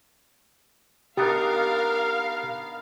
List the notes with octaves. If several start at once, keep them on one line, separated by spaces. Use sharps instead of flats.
B3 D4 D#4 G4 A#4 F5